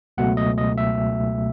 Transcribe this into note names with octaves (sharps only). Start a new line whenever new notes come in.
C#2 B2 F#3 A3 F#5
D#5
D#5
E5